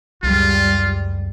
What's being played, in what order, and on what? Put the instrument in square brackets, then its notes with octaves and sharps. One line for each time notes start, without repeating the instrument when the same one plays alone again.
[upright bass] C#2 F#2 [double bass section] G3 [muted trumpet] F4